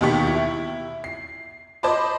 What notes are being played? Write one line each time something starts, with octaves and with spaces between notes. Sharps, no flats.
D#2 B2 D#3 G4 C#6 B6
E4
C7
C5 D#5 A5 B5 D6